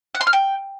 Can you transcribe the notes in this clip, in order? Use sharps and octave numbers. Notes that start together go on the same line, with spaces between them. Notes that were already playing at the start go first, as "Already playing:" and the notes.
F#5
C6
F6
G5